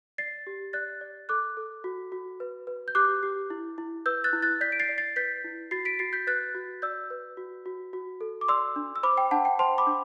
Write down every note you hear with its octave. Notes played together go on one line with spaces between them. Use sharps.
D5 A6 C7
G4
D5 F#6 A6
D5
A4 D6 F#6
A4
F#4
F#4
B4
B4
G6
G4 D6 F#6
G4
E4
E4
B4 E6 G6
F#6 A6
E4
F#6 A6
D5 G6 B6
D7
A6 C7
D5
A6 C7
B4 G6 B6
E4
F#4 A6 C7
B6 D7
F#4 A6 C7
G6 B6
B4 F#6 A6
F#4
D5 E6 G6
B4
F#4
F#4
F#4
A4
D6
D5 C6 E6
D4
E6
C5 B5 D6
G5
D4 F#5 A5
G5
C5 A5 C6
B5 D6
D4